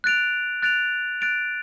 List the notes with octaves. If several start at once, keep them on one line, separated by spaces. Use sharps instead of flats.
F#6 A6 D7 F7
F#6 A6 D7 F7
F#6 A6 D7 F7